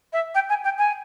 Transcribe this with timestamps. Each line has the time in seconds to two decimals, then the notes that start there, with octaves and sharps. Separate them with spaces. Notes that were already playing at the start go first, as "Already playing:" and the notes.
0.13 E5
0.35 G5
0.49 G#5
0.64 G5
0.78 G#5